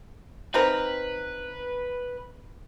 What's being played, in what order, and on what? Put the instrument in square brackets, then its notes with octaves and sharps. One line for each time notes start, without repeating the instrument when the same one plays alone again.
[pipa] C4 D#4 A#4 [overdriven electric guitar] B4